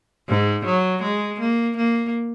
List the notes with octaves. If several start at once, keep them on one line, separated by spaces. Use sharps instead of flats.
G#2
F#3
G#3
A#3
A#3